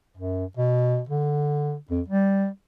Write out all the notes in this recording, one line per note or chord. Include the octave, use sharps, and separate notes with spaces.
F#2
B2
D3
F2
G3